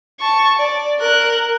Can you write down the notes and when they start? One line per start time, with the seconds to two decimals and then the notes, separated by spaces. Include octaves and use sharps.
0.20 A5 C#6
0.59 D5
1.00 A#4 F#6